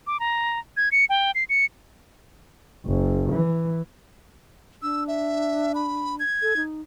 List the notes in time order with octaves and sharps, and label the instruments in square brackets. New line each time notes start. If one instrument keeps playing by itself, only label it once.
[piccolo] D6
A#5
G#6
C#7
G5
C7
C#7
[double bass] F#1
E3
[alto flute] D4 [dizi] E6
[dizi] E5
B5
G#6
[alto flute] A4
D#4